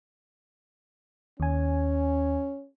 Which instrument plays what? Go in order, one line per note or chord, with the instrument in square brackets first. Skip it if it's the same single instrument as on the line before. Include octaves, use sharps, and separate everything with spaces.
[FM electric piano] D#2 G#5 [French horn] C#4